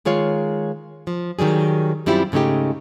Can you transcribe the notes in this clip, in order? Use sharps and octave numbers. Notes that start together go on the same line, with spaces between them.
D#3 G#3 F4 C#5 F5
F3
D#3 F#3 G3 G#4
F#2 G3 C4 E4 F4 G4
G#2 C#3 A3 D#4 G4